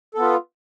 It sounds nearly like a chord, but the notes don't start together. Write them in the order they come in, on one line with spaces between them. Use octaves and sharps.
A4 B3 F4